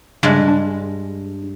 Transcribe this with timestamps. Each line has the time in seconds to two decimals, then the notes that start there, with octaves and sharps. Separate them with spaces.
0.23 G2 C#3 G#3
0.48 D4